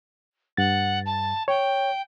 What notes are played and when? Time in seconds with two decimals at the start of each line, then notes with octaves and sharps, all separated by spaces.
0.57 G2 F#5 A6
1.06 A5
1.48 C#5 G5